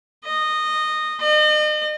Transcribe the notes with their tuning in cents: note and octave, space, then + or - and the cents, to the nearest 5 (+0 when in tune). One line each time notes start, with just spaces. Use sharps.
D#5 -15
D#5 -40